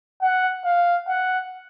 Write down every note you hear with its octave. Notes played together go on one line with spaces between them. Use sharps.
F#5
F5
F#5